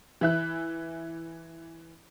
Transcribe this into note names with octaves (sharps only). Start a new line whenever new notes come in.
E3 E5 F#6